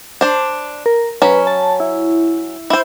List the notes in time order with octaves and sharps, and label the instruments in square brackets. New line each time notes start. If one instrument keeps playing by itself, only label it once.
[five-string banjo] D4 C5
[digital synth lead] A#4
[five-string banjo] F#3 C#4 [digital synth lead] B4
[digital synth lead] A5
E4
[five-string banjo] E4 C5 [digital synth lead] E5